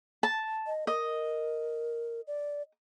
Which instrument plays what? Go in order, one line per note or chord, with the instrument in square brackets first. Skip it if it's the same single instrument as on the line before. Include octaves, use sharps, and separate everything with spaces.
[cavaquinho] A5
[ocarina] D#5
[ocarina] A#4 [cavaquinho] D#5
[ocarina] D5